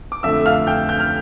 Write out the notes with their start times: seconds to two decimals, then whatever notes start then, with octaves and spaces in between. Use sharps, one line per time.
0.12 D6
0.23 F2 D3 A3 E5 E6
0.46 F5 F6
0.67 G5 G6
0.89 G6
1.00 F6